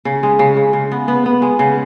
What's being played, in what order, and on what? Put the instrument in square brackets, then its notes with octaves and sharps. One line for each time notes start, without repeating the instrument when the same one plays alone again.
[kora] C#3
G#3
C#3
C#3
C#3
B3
B3
B3
G#3
C#3